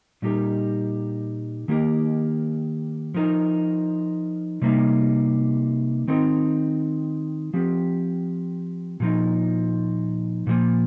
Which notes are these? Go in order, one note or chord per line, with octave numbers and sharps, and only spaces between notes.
A#2 G3 D#4 G4 A#4
D#3 A#3 G4 A#4
F3 D#4 A#4
C3 G3 A#3 D#4
D#3 C4 D#4 A#4
F3 C4 G4
A#2 F3 D#4
A#2 F3 A#3